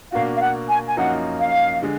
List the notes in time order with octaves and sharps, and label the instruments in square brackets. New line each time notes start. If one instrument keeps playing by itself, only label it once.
[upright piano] B2 A#3 D4 F#4 [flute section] F5
[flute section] F5
F#5
G#5
G#5
[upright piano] F#2 F3 A#3 D#4 F#4 [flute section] F#5
[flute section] F5
[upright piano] D3 G#3